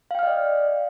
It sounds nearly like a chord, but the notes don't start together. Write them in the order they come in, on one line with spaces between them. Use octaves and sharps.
F5 G5 F6 D#5 D5